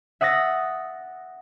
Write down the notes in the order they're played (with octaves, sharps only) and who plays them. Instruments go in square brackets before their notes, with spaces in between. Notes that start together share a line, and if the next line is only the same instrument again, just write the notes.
[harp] E5 F#5 D#6 A6 A#6